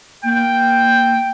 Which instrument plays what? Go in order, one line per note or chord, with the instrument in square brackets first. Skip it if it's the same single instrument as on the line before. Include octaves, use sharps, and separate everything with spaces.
[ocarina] A#3 [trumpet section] G5